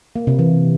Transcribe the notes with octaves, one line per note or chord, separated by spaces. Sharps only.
A#3
C3
E3